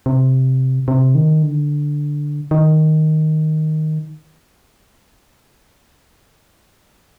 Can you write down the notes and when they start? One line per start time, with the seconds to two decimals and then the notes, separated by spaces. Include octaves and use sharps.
0.06 C3
0.88 C3
1.15 D#3
1.42 D3
2.51 D#3